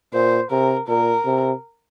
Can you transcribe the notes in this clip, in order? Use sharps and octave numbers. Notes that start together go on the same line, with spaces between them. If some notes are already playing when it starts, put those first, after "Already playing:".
A#2 C5
C3 A#4
A#2 A#4
C3